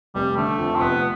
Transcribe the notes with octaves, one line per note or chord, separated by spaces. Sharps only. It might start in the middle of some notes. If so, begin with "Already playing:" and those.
F1 G3
D3 A3
F2
C4
F1 B3